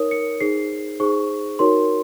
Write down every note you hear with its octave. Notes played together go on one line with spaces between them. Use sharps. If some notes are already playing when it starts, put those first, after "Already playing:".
Already playing: D#4 A#4 C#5 D#6
C#7
D#4 G#4 C5 C7
D#4 G#4 C5 C#6
D#4 F#4 A#4 C#5 C6